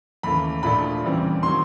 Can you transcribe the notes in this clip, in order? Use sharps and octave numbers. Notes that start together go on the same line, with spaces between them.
D#2 C#3 E3 A3 B5
A#1 A#2 F3 A3 D4 B5
E2 C#3 E3 G3 C4
D#3 F#3 A#3 C#4 C6